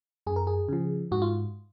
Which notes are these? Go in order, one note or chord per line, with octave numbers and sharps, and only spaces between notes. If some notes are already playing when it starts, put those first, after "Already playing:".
F#2 G#4
A#4
G#4
C#3 F3
G#2 F#4
F4